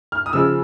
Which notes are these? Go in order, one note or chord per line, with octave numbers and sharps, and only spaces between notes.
F6
D#6
C#3 F3 G#3 E6